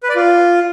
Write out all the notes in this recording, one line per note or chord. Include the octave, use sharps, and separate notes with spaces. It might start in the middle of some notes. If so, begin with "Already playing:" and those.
B4
D5
F4